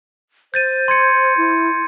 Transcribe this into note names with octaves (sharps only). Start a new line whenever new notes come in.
C5 G6 A6 D#7
C6 G#6 C#7
E4